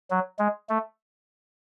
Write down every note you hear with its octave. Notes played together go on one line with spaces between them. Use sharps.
F#3
G#3
A3